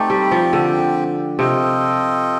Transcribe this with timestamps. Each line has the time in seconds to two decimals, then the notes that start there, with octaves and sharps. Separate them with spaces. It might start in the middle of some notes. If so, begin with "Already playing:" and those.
Already playing: A3 C4 D#4 G4 D5 G5
0.10 G3
0.31 F3
0.53 D3
1.38 C3 F4 A4 D#5 G5